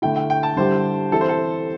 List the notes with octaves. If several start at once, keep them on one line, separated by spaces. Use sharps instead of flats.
D3 A3 E4 G5
G5
G5
A5
D3 G3 E4 G4 C5
E3 C4 E4 G4 A4
C5
A4